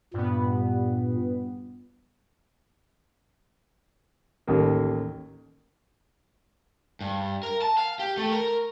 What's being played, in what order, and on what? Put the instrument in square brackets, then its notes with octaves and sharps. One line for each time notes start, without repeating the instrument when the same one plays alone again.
[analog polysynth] G2 B3 [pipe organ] A#2
[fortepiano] A1 D#2 A#3
[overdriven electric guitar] G2
A#4
A5
F5
G4
A3
A#4